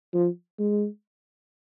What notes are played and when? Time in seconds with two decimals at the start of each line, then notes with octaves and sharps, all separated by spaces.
0.14 F3
0.59 G#3